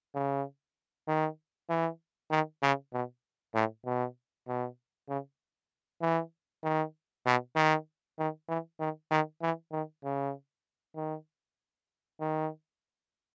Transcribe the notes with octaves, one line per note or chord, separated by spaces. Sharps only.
C#3
D#3
E3
D#3
C#3
B2
A2
B2
B2
C#3
E3
D#3
B2
D#3
D#3
E3
D#3
D#3
E3
D#3
C#3
D#3
D#3